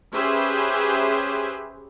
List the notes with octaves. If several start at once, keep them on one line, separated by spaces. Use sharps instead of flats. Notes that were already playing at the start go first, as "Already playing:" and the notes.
C#4 G4 G#4 B4 C5 E5